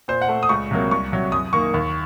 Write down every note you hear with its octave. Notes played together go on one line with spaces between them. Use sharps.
A#2 C5
F#5
A3
D#6
C#2 C#6
C3 F#3 A#3
C2 C#6
C3 F#3
F#2 D#6
D#3 A#3 C#6
D#2